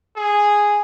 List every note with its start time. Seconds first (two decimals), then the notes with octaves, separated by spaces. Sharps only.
0.16 G#4